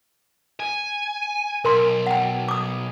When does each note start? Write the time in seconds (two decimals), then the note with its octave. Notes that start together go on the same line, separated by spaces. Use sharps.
0.60 G#5
1.65 B1 A#4 C6
2.07 F#5 G5
2.49 D6 D#6